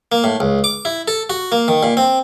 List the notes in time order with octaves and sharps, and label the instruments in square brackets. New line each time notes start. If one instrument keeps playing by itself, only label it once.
[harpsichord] A#3
A2
C#2
D6
E4
A4
F#4
A#3
D#3
A#2
C4